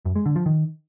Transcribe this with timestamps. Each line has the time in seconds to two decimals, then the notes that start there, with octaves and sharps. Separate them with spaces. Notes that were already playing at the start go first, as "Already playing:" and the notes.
0.05 F#2
0.16 G#3
0.26 D3
0.36 F3
0.46 D#3